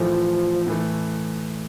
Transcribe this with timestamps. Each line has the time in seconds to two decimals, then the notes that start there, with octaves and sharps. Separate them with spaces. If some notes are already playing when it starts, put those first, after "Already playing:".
Already playing: A2 E3 F3 A3
0.67 A2 E3 A3